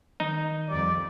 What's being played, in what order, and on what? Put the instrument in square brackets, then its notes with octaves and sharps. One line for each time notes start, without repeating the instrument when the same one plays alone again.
[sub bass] D#3 [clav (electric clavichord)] D#4
[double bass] F2 G3 [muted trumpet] D5